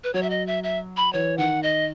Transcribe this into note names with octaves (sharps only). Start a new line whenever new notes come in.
B4
F#3 C#5
E5
D#5
E5
E5
B5
E3 C#5
D#3 F#5
D#5